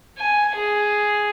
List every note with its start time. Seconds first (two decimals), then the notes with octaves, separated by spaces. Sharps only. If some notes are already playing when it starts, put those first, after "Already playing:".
0.18 G#5
0.56 G#4